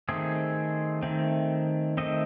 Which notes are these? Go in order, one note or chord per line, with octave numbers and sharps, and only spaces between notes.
D#3 A3 C4 G#4
D#3 A3 C4
D#3 A3 C4 D#5